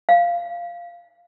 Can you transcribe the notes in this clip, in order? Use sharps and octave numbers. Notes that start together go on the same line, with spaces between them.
F5